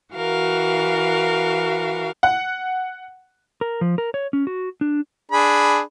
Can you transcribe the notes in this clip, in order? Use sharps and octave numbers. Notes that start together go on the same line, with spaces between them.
E3 F#4 A#4 F5
F#5
A#4
F3
A#4
C#5
C#4
F#4
D4
D4 G#4 B5